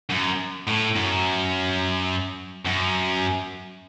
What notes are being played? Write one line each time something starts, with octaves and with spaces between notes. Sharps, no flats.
F#2
A2
F#2
F#2